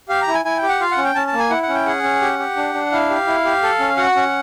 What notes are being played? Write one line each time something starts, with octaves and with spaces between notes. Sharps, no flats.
G4 F5
A#5
E4
G#5
E4 G#5
G5
G4
F#5
F4 F5
F#5
C#4
G5
C#4 A5
A5
A#3
G#5
E4 F#5
F#5
C#4
G5
G#4 F#5
C#4
G4
G4
D4
D4
E4 F5
G4
E4
G4
A4
C#4
F#4 F#5
C#4